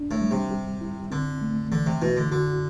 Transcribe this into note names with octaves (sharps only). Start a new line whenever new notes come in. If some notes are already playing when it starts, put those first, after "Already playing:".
Already playing: D4
A2
G3
C3
G4
E4
D3 C4
A3
D3 E3
C3
B2 E4
D3
D3 F#4